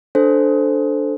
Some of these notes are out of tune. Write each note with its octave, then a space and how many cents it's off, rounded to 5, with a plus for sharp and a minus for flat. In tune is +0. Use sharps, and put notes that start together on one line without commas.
D4 +0 A4 +0 C5 +0